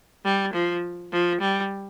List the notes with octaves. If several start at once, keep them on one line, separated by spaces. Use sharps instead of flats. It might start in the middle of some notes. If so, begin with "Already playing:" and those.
G3
F3
F3
G3